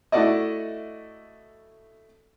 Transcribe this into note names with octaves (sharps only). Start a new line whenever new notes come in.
A3 E4 F#4 A4 D5 D#5